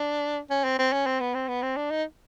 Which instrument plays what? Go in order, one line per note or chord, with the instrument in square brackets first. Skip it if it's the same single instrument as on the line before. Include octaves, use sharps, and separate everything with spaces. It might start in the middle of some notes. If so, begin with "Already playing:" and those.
Already playing: [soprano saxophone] D4
C#4
C4
C4
C#4
C4
B3
C4
B3
C4
D4
D#4